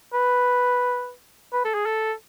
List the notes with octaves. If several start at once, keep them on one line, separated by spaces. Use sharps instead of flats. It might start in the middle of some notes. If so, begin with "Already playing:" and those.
B4
B4
A4
G#4
A4